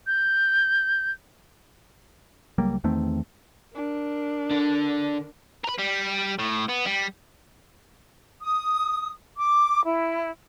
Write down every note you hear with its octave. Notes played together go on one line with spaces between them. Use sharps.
G6
C#2 F#3 G3 A#3
E2 D#3 A3 C4
D4 A#4
D3
A#4 B4
G3
A2
B3
G3
D#6
D6
E4